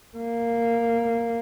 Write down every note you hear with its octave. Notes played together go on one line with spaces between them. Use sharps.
A#3